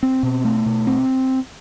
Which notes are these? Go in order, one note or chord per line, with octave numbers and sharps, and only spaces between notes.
C4
B2
A3
B2
C4